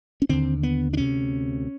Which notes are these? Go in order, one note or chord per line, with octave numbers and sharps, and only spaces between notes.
C#4
D#2 D3 C4
B3
D4
D2 C3 C#4